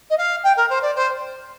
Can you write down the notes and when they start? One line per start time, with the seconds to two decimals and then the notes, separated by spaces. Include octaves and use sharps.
0.10 D#5
0.18 F5
0.44 G5
0.57 A#4
0.70 C5
0.82 D5
0.96 C5